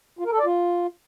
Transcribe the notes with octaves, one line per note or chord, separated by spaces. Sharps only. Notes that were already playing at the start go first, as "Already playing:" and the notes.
F4
A#4
A4
D5
F4